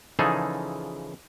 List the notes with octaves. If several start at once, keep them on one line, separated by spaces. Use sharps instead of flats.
C#3 E3 F3 D#4 G#4 A4